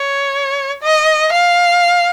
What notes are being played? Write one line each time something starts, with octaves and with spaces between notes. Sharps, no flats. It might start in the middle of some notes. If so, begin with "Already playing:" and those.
Already playing: C#5
D#5
F5